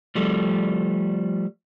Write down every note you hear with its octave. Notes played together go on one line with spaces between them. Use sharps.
F3 G3 A3